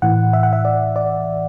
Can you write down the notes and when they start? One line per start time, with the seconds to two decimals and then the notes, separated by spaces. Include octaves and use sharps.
0.02 A2 E3 F#5
0.33 E5
0.43 F#5
0.53 E5
0.65 D5
0.96 D5